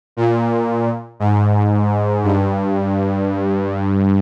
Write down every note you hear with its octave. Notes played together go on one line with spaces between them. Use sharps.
A#2
G#2
G2